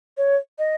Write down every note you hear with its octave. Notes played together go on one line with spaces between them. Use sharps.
C#5
D#5